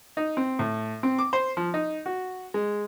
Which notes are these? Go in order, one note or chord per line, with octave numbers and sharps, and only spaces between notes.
D#4
C4
A2
C4
D6
C5
F3
D#4
F#4
G#3